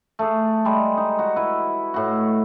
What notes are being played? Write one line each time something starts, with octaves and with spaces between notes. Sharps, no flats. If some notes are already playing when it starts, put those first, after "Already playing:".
A3 G#4
G3 G#3
D#4
F#4
E4 B4
A2 F#4